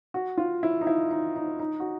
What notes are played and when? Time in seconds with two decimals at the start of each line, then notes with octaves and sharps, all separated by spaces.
0.14 F#4
0.38 F4
0.63 E4
0.81 D#4
0.87 E4
1.11 D#4
1.36 D#4
1.60 D#4
1.80 F#4